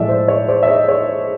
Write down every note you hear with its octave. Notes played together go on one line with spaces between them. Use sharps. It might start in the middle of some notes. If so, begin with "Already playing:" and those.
Already playing: A2 F3 G#3 D5 E5
C5
C#5
C5 D5
E5
C#5 D#5
C#5